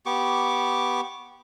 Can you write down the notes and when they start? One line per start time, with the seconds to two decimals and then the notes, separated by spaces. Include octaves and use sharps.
0.06 B3 G4 C#6 D6